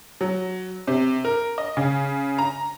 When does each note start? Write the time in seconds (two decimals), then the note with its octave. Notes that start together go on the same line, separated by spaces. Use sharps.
0.21 F#3
0.88 C3
1.25 A#4
1.58 D#5
1.77 C#3
2.38 A#5